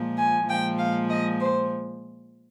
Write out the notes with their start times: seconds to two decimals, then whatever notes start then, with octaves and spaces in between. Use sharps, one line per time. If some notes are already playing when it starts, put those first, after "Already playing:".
Already playing: A#2 F3 G#3
0.17 G#5
0.48 A#2 F3 G#3 G5
0.79 F5
1.09 D#5
1.41 C5